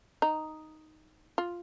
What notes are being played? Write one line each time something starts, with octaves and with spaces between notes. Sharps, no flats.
D#4
F4